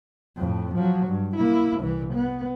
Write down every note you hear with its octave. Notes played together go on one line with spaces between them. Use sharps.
F2 A2
F3 F#3
G2
A#3 E4
C2 E3
B3